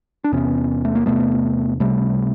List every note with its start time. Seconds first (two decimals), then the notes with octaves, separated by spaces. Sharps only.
0.24 D4
0.32 E2 C3 B3 C#4
0.85 A3
0.95 A#3
1.06 E2 C3 A3 B3
1.80 C#2 C3 G3 A3